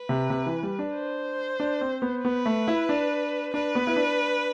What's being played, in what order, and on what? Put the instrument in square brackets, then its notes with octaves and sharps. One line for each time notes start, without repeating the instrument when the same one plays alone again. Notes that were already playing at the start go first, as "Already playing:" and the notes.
Already playing: [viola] B4
[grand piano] C3
C3
E3
G3
D4
[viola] C5
[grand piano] D4
C4
B3
[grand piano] B3 [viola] B4
[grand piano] A3
E4
D4
[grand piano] D4 [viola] B4
[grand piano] B3
E4
D4